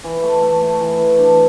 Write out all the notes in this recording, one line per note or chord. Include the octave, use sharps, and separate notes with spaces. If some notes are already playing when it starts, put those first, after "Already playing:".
E3
A3
A3
A3
E3
E3
D4